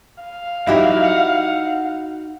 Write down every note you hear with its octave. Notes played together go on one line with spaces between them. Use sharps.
F5
F#3 D#4 E4 F#4 G4 E5
F#5